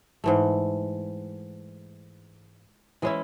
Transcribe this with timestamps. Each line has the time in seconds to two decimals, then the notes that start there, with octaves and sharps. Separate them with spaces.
0.24 G#2 E3 A3
3.02 E3 G#3 C#4 E4